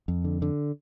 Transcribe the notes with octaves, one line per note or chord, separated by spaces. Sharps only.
F2
D3
D3